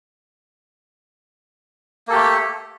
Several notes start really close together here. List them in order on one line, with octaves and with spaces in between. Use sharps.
A#3 A4 G4 A3